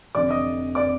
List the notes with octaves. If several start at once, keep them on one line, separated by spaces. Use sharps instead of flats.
F1 F2 D3 D5 D6
D#5 D#6
D5 D6